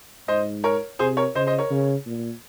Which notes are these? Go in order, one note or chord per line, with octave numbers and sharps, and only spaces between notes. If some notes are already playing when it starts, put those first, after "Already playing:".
G#2 C5 D#5
A#4 C#5
C3 G#4 C5
A#4 C#5
C#3 C5 D#5
C5 D#5
A#4 C#5
C#3
A#2